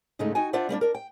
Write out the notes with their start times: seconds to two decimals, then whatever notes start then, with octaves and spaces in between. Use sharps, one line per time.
0.19 G#2 C#3 G#3 A3 D#4
0.35 D#4 F#4 G5 G#5
0.53 D4 F4 C5 D5 E5 F#5
0.69 G3 A#3 C#4 D4
0.81 D4 A#4
0.95 G5